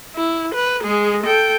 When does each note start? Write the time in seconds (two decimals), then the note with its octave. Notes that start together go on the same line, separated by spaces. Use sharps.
0.15 E4
0.55 B4
0.83 G#3 G#4
1.23 A4 G5